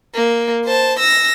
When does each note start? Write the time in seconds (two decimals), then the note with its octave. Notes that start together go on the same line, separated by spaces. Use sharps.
0.15 A#3
0.65 C5 A5
0.99 E6 A#6